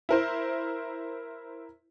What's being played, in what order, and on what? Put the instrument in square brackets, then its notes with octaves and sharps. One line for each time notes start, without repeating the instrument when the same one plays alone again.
[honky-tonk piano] E4 A#4 C5